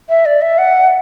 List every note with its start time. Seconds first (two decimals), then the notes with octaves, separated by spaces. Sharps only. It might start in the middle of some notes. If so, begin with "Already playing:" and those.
0.09 E5
0.26 D5
0.42 E5
0.58 F#5